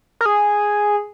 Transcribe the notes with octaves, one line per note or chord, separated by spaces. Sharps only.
A#4
G#4